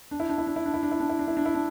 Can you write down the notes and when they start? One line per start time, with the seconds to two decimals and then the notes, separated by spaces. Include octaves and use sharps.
0.11 D4
0.20 E4
0.29 D4
0.38 E4
0.47 D4
0.56 E4
0.65 D4
0.74 E4
0.83 D4
0.91 E4
1.00 D4
1.09 E4
1.19 D4
1.28 E4
1.37 D4
1.46 E4
1.55 D4